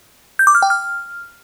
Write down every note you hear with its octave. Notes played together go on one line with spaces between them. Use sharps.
G6
D6
F6
G5
F6